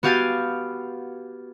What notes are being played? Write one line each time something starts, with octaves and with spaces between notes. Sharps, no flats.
B3 F#4 G4 F5 G#5 A6